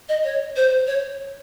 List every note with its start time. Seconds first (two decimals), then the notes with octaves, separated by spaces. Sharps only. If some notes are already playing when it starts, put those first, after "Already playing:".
0.09 D#5
0.24 C#5
0.57 C5
0.87 C#5